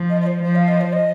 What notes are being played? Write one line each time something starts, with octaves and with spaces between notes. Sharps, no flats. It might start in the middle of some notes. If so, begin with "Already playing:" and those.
Already playing: F3
D#5
D#5
C5
F3 C5
F5
D#5
C5
D#5